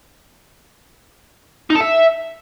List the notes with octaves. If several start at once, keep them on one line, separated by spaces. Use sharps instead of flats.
D#4
A4
E5